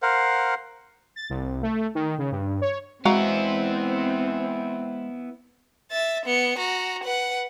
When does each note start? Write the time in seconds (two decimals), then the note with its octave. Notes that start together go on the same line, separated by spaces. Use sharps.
0.02 A#4 C5 F5 F#5
1.16 A6
1.30 C2
1.62 A3
1.95 D#3
2.18 C#3
2.32 G2
2.61 C#5
3.05 G#3 B3 C4 E4 F#4 F5 A#5
5.91 E5 A6
6.26 B3 C#7
6.58 F#4 A#5
7.03 B4 F#5